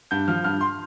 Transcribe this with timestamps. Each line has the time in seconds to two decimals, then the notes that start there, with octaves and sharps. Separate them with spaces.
0.11 G2 G6
0.28 F3 F6
0.44 G2 F6
0.61 C6